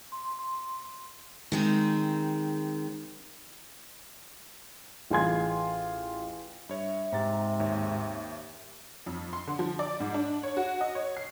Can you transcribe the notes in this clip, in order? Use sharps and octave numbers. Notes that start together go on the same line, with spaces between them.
C6
C6
D#3 G#3 C4
A1 F4 G#4 G#5 C6 G#6
G2 C#5 E5
G#2 C3 A#5 A6
D#2 G4 C#5
F2
C6
D3
F3
D5
G#2
D4
C#5
F#4
D#5
C#5
C7